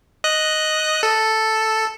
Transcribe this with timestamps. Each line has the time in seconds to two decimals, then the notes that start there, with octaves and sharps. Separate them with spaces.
0.24 D#5 F#6
1.03 A4